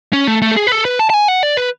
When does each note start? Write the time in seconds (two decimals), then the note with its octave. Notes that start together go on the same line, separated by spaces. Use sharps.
0.13 C#4
0.27 A3
0.42 A3
0.51 A4
0.57 G#4
0.67 B4
0.72 A4
0.85 B4
0.99 A5
1.10 A5
1.14 G#5
1.28 F#5
1.43 D5
1.57 B4